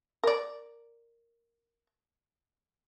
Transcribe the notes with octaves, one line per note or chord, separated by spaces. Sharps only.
A#4 D5